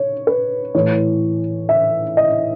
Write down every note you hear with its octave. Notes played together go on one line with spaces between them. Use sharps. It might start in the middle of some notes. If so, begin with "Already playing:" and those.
Already playing: C#5
B4
A2 E3 C#5
E5
D#5